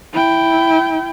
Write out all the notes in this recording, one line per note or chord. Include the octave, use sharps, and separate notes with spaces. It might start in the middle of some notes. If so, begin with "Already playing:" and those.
E4 G5